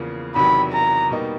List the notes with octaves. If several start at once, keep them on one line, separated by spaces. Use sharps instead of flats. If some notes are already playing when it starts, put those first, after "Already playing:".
Already playing: E2 C#3 F3 A#3
E2 C3 D#3 F#3 B5
A#5
B2 G3 A#3 D#4